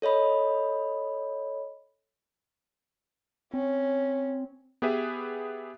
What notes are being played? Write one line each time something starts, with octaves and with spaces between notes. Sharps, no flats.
A4 C#5 D#5 B5
C4 C#4
B3 G4 G#4 B4 E5